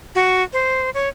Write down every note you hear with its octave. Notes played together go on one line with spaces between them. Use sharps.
F#4
C5
C#5